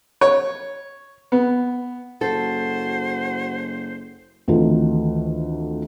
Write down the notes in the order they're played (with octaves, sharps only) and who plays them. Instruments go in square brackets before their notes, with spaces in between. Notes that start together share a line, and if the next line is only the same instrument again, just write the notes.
[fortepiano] C#5
B3
[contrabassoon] F#1 [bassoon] F#4 [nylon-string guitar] A4 [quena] C5
[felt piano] D2 D#3 E3 C4 F4 A4